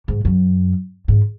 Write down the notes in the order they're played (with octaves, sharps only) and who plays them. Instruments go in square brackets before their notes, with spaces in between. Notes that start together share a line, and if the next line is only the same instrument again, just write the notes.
[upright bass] G#2
F#2
G#2